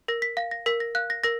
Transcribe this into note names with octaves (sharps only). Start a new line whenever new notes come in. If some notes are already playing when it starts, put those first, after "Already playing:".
A#4 A#6
B6
F5 A#6
A#6
A#4 B6
A#6
F5 F#6
A#6
A#4 A#6